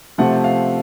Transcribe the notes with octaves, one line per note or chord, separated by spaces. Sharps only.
C3 F3 A3 F#5
F5